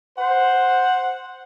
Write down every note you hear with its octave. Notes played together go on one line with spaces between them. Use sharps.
C5 F#5